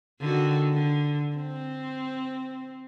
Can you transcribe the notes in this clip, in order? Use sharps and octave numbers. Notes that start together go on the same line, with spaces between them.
D3 D#3 F#4
D3
C4